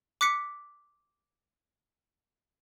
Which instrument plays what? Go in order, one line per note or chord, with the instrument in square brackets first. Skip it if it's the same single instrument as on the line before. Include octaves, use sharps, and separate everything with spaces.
[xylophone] D6 F#6 B6 C#7